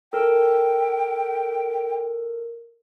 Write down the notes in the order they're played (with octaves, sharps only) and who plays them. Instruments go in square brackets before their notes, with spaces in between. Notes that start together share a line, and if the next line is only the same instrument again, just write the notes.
[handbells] A4 A#4 D7 [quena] G5